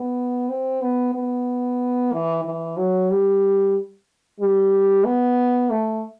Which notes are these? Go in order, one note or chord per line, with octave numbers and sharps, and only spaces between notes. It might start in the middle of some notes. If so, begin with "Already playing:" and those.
Already playing: B3
C4
B3
B3
E3
E3
F#3
G3
G3
B3
A3